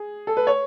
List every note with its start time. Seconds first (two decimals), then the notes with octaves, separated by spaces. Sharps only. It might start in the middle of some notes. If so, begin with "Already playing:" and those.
Already playing: G#4
0.27 A4
0.37 B4
0.47 C#5